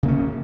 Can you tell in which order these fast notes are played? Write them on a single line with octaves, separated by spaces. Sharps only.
C#3 A#3 C#4